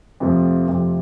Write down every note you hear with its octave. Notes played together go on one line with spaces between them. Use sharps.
F2 C3 F3 A3
F2 C3 F3 A3